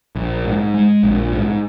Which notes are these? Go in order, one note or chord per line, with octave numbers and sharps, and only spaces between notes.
A#1
G#2
G#3
A#1
G#2